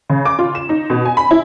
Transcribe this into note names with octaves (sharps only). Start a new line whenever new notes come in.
C#3
D6
F4
E7
D#4
B2
G#5
B5
E4